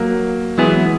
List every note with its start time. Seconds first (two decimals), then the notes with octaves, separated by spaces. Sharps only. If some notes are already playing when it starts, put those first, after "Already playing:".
Already playing: F#3 A#3
0.58 E3 F#3 G#3 B3 E4 G#4